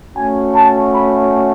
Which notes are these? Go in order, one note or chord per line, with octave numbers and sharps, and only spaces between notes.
A3 C#4 F#4 G#5
A5
B5